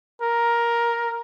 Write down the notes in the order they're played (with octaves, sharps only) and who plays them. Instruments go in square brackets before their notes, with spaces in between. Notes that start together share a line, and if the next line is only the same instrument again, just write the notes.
[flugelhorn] A#4